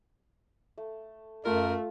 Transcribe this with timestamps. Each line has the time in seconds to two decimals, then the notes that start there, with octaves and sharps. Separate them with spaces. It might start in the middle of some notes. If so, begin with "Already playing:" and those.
0.78 A3
1.45 F#2 A3 F4 A#4